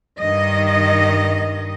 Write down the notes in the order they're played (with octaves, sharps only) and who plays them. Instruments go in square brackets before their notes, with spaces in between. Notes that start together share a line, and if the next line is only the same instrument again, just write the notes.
[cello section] G2 D#3 D#5